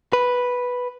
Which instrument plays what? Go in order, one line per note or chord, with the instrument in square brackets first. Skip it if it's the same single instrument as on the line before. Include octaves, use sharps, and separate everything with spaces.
[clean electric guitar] B4